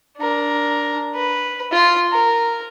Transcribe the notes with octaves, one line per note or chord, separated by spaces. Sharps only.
D4 A#4
B4
F4 C6
A#4